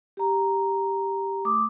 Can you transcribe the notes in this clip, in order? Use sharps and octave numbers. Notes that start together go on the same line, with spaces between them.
G4 A#5
A3 D6 D#6